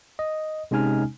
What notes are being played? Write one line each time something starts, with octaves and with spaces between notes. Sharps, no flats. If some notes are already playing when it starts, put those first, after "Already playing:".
D#5
C3 G#3 C#4 D#4 G#5 F6